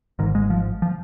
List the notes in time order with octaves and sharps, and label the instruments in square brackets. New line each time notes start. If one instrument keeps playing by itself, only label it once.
[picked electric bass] G#2 D#3
G#1
G#3
F3
F3